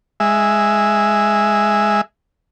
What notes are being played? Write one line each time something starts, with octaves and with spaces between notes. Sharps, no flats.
G#3 E5